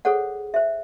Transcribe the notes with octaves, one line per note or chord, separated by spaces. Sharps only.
G#4 A4 C5 C#5 F#5
C5 E5